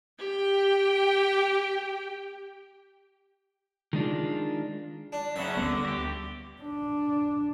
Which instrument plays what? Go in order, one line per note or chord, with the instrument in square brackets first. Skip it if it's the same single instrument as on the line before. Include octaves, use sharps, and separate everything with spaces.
[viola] G4 G5
[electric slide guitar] D#3 G#3 D4 F4
[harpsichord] D4
[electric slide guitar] F#2 C#3 C#4 [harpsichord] E5 F#5
[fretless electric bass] D2 G3 B3 [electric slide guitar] D3
[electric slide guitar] F#4 G4
[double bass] D4